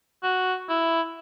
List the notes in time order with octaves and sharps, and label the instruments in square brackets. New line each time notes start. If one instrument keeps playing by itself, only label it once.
[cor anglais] F#4
E4